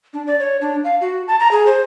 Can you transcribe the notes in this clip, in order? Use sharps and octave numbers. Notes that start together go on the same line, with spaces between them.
D4
D5
C#5
D4
F5
F#4
A5
A#5
G#4
C5